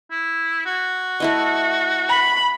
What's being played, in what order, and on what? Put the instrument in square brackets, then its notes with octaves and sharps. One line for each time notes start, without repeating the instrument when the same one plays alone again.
[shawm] E4
F#4
[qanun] A3 E4 D#5
[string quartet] B5